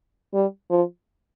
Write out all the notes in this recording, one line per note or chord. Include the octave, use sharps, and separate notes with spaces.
G3
F3